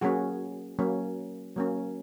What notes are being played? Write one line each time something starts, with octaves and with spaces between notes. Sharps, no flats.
F#3 A#3 C#4 F#4 G#4
F#3 A#3 C#4
F#3 A#3 C#4